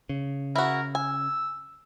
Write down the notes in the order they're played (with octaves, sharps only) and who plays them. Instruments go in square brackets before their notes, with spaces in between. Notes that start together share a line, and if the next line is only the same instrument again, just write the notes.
[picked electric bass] C#3
[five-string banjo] E4 F#4 [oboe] A#4
[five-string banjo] G#5 [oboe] E6